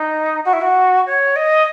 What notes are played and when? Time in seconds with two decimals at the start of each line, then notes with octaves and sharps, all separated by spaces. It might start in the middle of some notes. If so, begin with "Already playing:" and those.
Already playing: D#4
0.45 F#4
0.53 E4
0.61 F#4
1.06 C#5
1.36 D#5